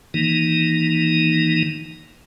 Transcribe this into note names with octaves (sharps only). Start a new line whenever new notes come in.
D#3 E3 A#3 D#4